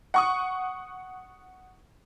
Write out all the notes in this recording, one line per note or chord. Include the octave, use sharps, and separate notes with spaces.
F#5 C#6 D#6